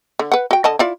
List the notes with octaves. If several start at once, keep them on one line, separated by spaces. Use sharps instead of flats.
D3
B4 F#5
F#4 G5
D3 D#5 A5
E4 F4 D5